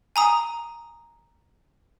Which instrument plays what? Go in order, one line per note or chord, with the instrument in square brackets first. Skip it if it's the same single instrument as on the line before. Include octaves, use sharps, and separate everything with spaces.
[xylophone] G#5 A#5 D#6